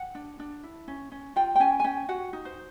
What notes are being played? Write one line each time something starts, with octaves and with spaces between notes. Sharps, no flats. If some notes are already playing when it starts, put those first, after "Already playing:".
Already playing: F#5
D4
D4
E4
C#4
C#4
F4 G5
G5
C#4 G#5
G#5
C#4 G5
F#4 F#5
D#4
C5